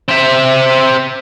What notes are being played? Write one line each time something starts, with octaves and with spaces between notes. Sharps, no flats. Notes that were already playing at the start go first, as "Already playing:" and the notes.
C4 E5